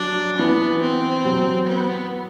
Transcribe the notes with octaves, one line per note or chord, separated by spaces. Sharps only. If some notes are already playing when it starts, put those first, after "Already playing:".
Already playing: F#3 D4
E3 B3
C4
F#3
B3